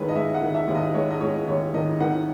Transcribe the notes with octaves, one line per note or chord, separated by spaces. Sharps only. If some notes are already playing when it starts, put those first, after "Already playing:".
Already playing: D#2 D#3 G#3 B4 C#5
D#5
G#3 E5
F#5
D#3
E5
D#2
D#5
G#3 C#5
D#5
G#3 C#5
D#2 C#5
D#3 D#5
D#3 F#5